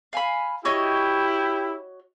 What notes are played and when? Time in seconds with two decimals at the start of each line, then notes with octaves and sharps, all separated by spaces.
0.13 F5 G#5 B5
0.65 E4 F#4 G4 C#5 D#5